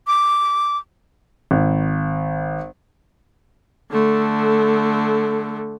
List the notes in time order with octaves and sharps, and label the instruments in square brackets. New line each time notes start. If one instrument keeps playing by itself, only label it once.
[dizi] D6
[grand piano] G#1
[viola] D3 A3